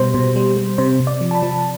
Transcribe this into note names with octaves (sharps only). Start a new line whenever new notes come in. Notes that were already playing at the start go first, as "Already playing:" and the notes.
Already playing: B2 G3 C5
B2
G3
G3
C3 C5
C3
D5
F3
A5
B5
F3